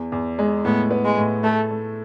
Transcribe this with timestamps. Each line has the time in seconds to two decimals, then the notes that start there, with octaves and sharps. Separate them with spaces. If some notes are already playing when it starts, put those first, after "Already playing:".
Already playing: E2
0.12 E2
0.39 G#3
0.65 A2 B3
0.91 B3
1.05 G#3
1.18 A2
1.43 A3 A4
1.71 A3